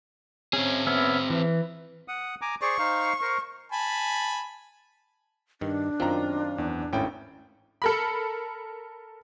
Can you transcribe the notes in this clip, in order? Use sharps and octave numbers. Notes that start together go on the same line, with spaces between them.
C4 C#4 G#4
B3 C#4 E5
E3
F#5 D#6
G#5 A#5 D6
G#4 C5 D5 C#6
D#4 C5 F5
A#4 C5
G#5 A5 B5
G2 D#3 D4
F#2 D#3 C4 F4 A#5
E2
G#1 A2 C#4 E4 G5
A4 A#4 B5